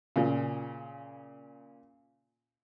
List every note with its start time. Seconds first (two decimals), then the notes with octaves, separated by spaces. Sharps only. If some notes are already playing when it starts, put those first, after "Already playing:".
0.16 A#2 C#3